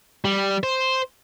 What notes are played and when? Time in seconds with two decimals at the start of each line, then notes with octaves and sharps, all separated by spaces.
0.25 G3
0.63 C5